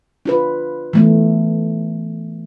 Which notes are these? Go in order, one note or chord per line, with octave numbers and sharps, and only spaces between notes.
D4 F4 B4
E3 A3 B3